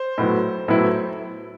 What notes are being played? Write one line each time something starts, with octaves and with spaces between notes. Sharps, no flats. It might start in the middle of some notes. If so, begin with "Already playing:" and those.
Already playing: C5
A2 F#3 B3 E4
A2 F#3 B3 E4